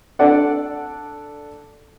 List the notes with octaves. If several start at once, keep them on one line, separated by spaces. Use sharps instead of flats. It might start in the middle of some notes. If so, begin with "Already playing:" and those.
D4 A4 D5 F#5